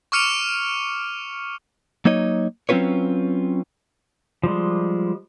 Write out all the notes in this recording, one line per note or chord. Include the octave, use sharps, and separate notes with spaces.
C#6 D6 F6 C#7 D#7 F7
F#3 A#3 D#4 C#5 D#5
F#3 C4 C#4 F4 B4 C#5
F3 G3 G#3